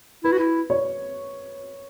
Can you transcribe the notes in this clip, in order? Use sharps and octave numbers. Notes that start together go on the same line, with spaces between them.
E4 B4
F#4
E4
C#5